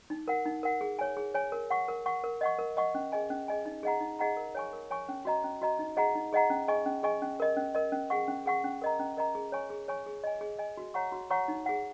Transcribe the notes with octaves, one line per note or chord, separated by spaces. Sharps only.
D#4
A#4 F#5
D#4
A#4 F#5
G#4
C#5 G#5
G#4
C#5 G#5
A#4
F#5 C#6
A#4
F#5 C#6
A#4
D#5 F#5 C#6
A#4
D#5 F#5 C#6
C#4
G#4 D#5 G#5
C#4
G#4 D#5 G#5
D#4
G#4 D#5 F#5 A#5
D#4
G#4 D#5 F#5 A#5
A#4
C#5 G#5 C#6
A#4
C#5 G#5 C#6
C#4
F#4 D#5 A#5
C#4
F#4 D#5 A#5
D#4
G#4 D#5 F#5 A#5
D#4
G#4 D#5 F#5 A#5
C#4
G#4 D#5 G#5 C#6
C#4
G#4 D#5 G#5 C#6
C#4
A#4 D#5
C#4
A#4 D#5
C#4
G#4 F#5 C#6
C#4
G#4 F#5 C#6
C#4
A#4 D#5 A#5
C#4
A#4 D#5 A#5
G#4
C#5 G#5 C#6
G#4
C#5 G#5 C#6
G#4
D#5 G#5
G#4
D#5 G#5
F#4
C#5 F#5 A#5 C#6
F#4
C#5 F#5 A#5 C#6
D#4
G#4 F#5